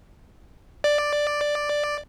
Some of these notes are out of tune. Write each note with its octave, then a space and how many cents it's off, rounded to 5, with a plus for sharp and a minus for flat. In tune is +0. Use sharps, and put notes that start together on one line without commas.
D5 +5